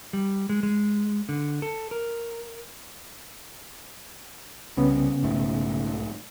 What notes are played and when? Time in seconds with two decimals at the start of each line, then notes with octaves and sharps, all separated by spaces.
0.13 G3
0.49 G#3
0.63 G#3
1.29 D3
1.62 A4
1.91 A#4
4.77 C2 C#3 B3 C#4
5.23 B1 G#2 A3